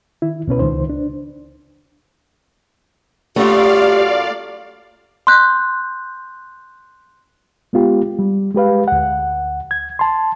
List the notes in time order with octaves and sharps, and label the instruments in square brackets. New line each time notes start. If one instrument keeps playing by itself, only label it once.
[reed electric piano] D#3 E4
C#2 B2 C#4 B4
C#2 D#3 D#4 C5
D4
[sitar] F#2 F4 [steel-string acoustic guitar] A3 [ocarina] G4 [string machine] D5 F5
[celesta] C6 F#6 G6
[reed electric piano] G#3 B3 F4 G4
G3
G#3 G4 B4 F5
D2 F#5
G#6
A5 C6